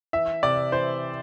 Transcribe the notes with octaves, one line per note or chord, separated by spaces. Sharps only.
E3 E5
C3 D5
E3 C5